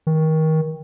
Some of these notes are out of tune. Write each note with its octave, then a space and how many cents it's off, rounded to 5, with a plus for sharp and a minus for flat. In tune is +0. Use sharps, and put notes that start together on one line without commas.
D#3 +25